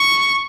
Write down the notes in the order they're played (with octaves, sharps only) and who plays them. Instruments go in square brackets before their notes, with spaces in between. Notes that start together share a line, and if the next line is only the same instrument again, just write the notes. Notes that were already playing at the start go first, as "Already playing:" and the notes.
Already playing: [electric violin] C#6